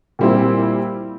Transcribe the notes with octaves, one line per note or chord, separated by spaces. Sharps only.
A#2 G3 C4 E4